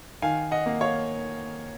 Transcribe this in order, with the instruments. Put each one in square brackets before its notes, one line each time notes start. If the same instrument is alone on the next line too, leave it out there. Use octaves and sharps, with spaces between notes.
[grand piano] D#3 F5 G#5
D#5 F#5
A#3
C#5 F5